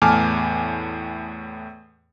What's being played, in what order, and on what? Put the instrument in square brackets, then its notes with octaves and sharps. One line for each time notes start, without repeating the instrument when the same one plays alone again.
[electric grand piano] E2 A2 G#5 A5 D6 F6